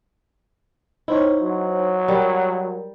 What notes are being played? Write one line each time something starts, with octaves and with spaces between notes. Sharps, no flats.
D#4 E4 C5 C#5
F#3
G3 A#4